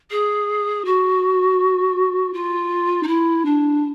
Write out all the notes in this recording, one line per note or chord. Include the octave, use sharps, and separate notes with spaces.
G#4
F#4
F4
D#4
E4
D4